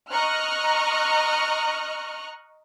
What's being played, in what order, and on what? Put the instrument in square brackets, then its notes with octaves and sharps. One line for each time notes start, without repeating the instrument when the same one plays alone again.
[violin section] D#5 A#5 C#6 F6 F#6